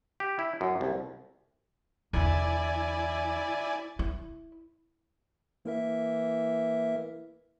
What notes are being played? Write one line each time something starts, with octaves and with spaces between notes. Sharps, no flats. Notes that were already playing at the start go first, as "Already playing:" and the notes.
G4
E4
F#2
C2
E2 D3 E4 D5 G#5
E4
E3 A#3 A#4 E5